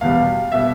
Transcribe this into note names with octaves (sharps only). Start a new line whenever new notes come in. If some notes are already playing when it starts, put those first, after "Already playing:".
E2 B2 G3 F5
B2 G3 E5